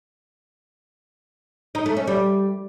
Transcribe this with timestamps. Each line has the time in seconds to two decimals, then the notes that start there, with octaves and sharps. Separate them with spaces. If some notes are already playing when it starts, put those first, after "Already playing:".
1.75 D#4
1.86 A3
1.97 C#4
2.07 G3